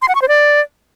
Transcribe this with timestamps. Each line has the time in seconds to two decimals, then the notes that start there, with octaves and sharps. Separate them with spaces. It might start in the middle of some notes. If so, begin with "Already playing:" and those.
0.02 C6
0.08 F#5
0.15 C#6
0.22 C5
0.28 D5